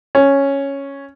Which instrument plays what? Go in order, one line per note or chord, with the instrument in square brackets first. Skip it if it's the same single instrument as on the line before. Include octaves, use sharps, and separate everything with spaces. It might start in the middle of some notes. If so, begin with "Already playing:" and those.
[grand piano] C#4